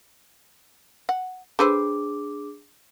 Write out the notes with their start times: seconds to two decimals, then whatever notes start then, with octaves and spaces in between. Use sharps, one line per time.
1.09 F#5
1.59 D4 G#4 A4 B4 C5 D6